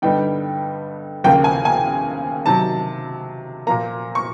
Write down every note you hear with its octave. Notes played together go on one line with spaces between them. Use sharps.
G2 D3 G3 B3 D#4 G5
D#2 C#3 F3 A#3 G5
G#5
G#5
C3 D#3 F#3 A5
A#2 F3 A#3 A#5
C#6